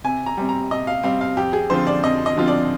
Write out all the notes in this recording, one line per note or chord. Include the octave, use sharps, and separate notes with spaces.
C3 G#5
A#5
G3 C4
A#5
C3 D#5
F5
G3 C4 F5
F5
F2 G4
G#4
D3 F3 C4 F4 C5
D5
F2 D#5
D#5
D3 F3 C4 F4
D5